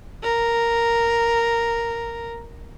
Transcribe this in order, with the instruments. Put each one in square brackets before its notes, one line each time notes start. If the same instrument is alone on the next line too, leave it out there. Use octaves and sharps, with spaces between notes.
[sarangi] A#4